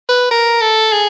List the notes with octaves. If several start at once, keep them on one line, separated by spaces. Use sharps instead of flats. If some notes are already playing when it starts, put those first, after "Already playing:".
B4
A#4
A4
G#4